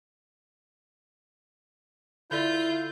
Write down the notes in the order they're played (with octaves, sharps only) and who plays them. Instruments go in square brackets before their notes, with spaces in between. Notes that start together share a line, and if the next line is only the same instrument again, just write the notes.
[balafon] D3 A4 D5 [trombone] E4 [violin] F4 [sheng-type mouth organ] G6